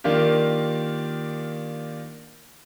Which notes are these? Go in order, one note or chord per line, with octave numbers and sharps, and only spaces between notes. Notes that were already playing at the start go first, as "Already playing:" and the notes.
D#3 A#3 D4 F4 G4